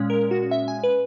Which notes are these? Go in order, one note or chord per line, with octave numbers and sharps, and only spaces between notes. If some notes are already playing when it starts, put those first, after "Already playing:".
Already playing: A#2 G#3 C#4
A#4
F#4
E5
G#5
B4